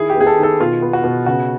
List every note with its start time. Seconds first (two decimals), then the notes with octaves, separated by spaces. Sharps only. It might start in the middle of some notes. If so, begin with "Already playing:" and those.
Already playing: D#3 E4 G#4
0.10 G4
0.15 B3
0.21 G#4
0.27 A4
0.38 D#3
0.43 A4
0.60 B2 F4
0.82 B3
0.93 F#4
1.04 B2
1.26 C#3 F#4